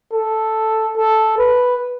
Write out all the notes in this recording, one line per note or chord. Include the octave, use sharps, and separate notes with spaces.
A4
A4
B4